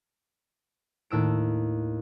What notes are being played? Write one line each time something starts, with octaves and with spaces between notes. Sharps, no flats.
D#2 A2 E6 D7